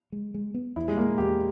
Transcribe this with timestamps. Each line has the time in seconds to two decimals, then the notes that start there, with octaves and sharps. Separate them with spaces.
0.12 G#3
0.34 G#3
0.54 B3
0.76 E2 E4
0.88 G#3
0.97 G3 A#3
1.18 E2 G4